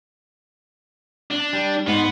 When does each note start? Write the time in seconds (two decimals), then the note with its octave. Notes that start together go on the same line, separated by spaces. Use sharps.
1.31 D4
1.53 G3
1.87 G#2 B3